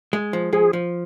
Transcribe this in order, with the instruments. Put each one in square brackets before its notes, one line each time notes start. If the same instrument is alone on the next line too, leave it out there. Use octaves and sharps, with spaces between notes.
[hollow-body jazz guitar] G#3
F3
[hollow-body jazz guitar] F3 [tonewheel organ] G#4
[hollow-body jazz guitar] F3